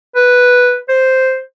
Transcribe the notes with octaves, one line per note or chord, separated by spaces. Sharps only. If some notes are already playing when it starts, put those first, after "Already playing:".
B4
C5